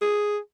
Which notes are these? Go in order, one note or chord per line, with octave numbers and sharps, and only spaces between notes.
G#4